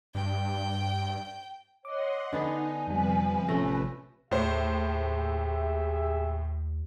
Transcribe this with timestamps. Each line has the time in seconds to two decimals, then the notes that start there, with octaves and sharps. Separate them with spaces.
0.15 G2 G5
1.85 C#5 D#5 F#5 C6 D6
2.32 D3 B3 D4 D#4 G#5
2.87 F2 C3 F3 G3 B4
3.49 A1 A3 C#4 A#6
4.31 D#2 A2 G4 G#4 C5 E5